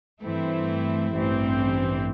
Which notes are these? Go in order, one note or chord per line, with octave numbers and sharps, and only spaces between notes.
G2 E3 A3 C4 E4
A1 G2 E3 C4